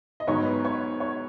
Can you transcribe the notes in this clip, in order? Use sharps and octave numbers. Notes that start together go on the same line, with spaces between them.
D#5
G#2 F#3 B3 C#5
B4
C#5
C#5